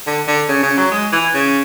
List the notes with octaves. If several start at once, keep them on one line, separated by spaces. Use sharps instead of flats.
D3
D3
C#3
C#3
F#3
G#3
E3
C#3